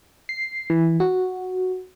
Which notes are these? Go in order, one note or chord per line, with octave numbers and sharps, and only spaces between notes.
C7
E3
F#4